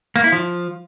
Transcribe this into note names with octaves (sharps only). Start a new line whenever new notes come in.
A#3
E4
F3